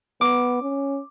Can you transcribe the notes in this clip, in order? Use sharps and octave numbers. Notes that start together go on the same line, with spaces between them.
B3 D6
C#4